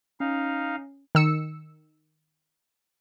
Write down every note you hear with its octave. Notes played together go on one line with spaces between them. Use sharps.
C#4 D#4 F5
D#3 E6 C#7